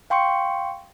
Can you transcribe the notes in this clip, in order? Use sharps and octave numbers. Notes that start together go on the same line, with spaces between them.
F5 G5 C6 C#6 C#7